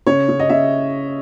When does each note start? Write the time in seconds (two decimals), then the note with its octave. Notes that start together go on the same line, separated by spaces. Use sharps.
0.07 C#3 C#5
0.29 C#3
0.40 D#5
0.49 C#3 E5